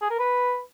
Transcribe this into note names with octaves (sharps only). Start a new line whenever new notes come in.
G#4
A#4
B4